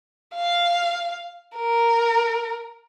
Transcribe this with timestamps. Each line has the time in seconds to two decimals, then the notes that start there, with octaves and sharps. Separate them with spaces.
0.36 F5
1.57 A#4